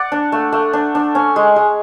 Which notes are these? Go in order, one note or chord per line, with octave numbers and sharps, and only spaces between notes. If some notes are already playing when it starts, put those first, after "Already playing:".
Already playing: D5 F#5
D4
A3
A3
D4
D4
C#4
G#3
G#3